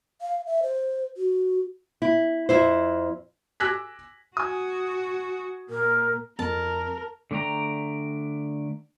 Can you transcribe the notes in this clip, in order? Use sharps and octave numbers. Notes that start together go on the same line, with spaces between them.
F5
E5
C5
F#4
E4
F2 E4 C5
G#5 D6 E6 F#6 A#6 B6
F#4 G#5 D#6
A#2 A#4
F2 A#4 A5
D3 A3 D5 G5 A#5